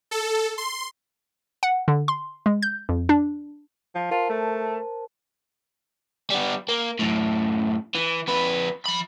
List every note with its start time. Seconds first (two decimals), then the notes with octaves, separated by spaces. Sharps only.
0.11 A4
0.58 C6
1.63 F#5
1.88 D3
2.08 C6
2.46 G#3
2.62 G6
2.89 F2
3.09 D4
3.95 F3
4.11 F4 A#4 C5 A5
4.30 A3
6.30 G3 B3
6.68 A#3
6.99 F#2 A2
7.95 E3
8.28 F2 B4
8.86 F3 B5